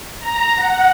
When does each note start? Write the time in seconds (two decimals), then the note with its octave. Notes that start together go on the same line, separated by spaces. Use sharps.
0.19 A#5
0.55 F#5